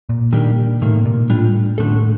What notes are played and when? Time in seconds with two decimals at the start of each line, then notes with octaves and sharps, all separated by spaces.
0.09 A#2
0.33 A#2 D#3 G3 A#3 D4 G4
0.81 A2 C3 D#3 A#3
1.06 A#2
1.30 A2 G3 D4 F4
1.78 A2 D3 A3 D4 A4
1.95 A2